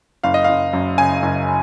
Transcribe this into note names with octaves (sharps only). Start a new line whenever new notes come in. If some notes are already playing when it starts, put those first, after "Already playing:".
F#1 F5
D#5
F#1 F5
F#2
C#3 G#5
F#1